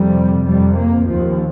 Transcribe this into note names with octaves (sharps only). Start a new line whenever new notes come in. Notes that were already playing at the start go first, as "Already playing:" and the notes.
Already playing: F2 C3 G3
F2 C3 G3
A#3
D#2 F3